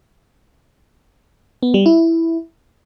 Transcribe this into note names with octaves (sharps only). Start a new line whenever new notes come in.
B3
G3
E4